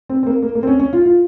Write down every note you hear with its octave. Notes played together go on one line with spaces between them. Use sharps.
C4
C4
A#3
A#3
A#3
C4
C#4
C#4
F4
F4